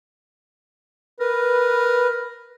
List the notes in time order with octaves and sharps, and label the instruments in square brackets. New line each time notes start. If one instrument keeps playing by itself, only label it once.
[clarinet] A#4 [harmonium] B4